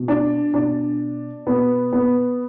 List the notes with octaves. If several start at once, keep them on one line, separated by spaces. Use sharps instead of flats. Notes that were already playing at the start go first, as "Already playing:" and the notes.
Already playing: B2
D4
B2 D4
B2 B3
B3